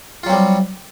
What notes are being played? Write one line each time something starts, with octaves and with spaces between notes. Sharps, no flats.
F#3 G3 C4 F4